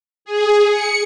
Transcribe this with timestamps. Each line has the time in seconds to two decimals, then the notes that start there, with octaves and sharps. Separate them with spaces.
0.25 G#4
0.70 C#7